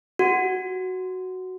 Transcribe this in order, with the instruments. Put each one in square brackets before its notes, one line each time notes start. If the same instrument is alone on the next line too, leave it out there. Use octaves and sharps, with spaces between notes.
[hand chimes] F#4